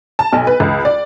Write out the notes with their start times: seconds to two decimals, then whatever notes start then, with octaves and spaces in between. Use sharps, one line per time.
0.19 A5
0.33 B1
0.47 B4
0.60 C#2
0.85 D5